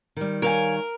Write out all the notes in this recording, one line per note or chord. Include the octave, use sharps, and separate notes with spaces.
D#3 G3
A#4 C#5 F5 G#5